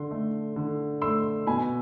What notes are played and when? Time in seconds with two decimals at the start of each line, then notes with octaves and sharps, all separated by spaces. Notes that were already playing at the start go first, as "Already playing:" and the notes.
Already playing: D3 C6
0.11 A3
0.56 D3
1.02 A3 C6 E6
1.47 B2 G#5 B5